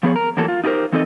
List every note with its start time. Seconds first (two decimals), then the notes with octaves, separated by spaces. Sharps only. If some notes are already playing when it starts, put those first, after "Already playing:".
0.03 F3 B3 G#4 C#5
0.16 A#4
0.37 E2 E3 F#3 A#3 A4
0.48 F4
0.64 D#4 F4 G4 G#4 A#4 C5
0.92 E3 C4 D#4 A4 D5 D#5